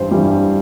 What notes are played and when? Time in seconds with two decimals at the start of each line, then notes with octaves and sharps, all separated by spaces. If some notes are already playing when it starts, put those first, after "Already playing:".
Already playing: G2 E3 G3 C5
0.11 G2 E3 G3